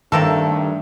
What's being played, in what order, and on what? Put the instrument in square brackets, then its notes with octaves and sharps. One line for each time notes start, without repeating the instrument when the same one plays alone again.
[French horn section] G2 A3 [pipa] C3 A#3 A4 [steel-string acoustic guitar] D#3